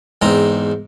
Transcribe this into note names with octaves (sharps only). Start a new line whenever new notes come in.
E2 G#2 C4 A#5